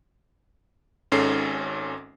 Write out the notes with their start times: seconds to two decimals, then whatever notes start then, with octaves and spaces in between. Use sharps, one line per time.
1.12 G#1 G#2 C#4 A4 C7